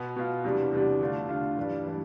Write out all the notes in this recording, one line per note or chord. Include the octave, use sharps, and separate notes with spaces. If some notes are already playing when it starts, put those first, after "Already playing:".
Already playing: B2 B3
B2 B3 F4
E2 C3 G3 D4
E2 C3 G3 D4
D3 A3 D4 F4
D3 A3 D4 F4
G2 E3 G3 D4
E3 G3 D4